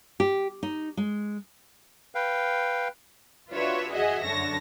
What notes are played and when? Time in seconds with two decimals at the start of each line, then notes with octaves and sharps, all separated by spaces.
0.20 G4
0.63 D#4
0.97 G#3
2.15 B4 F5 G5
3.52 D4 F4 F#4 B4 C#5 E5
3.92 F#4 G#4 D#5 E5 F#5 G#5
4.24 F#2 D3 C#5 A5 A#6